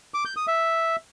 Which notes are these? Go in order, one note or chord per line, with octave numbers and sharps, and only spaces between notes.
D6
G6
D#6
E5